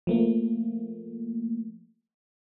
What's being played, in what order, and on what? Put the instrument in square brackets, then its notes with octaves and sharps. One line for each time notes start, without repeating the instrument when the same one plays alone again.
[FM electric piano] F3 A3 A#3